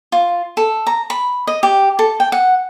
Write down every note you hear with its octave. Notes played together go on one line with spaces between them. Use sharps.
F4
A4
A#5
B5
D#5
G4
A4
G5
F#5